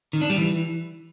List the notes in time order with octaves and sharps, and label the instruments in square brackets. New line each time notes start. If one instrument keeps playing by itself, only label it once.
[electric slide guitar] D#3
D4
G3
E3